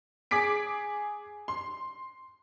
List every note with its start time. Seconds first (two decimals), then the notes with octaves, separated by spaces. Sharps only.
0.31 G#4 D6 B6 D7
1.48 C6